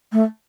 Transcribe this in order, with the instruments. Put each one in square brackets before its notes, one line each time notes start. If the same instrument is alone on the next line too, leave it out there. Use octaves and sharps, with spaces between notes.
[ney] A3